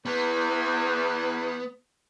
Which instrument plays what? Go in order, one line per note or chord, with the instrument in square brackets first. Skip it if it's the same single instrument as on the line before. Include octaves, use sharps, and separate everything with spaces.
[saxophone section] E2 [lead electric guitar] B3